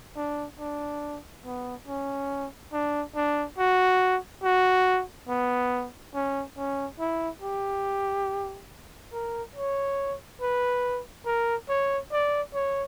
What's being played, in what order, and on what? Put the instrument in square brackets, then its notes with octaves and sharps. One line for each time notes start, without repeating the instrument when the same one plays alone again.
[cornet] D4
D4
B3
C#4
D4
D4
F#4
F#4
B3
C#4
C#4
E4
G4
A#4
C#5
B4
A#4
C#5
D5
C#5